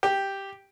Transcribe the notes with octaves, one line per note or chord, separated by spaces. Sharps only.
G4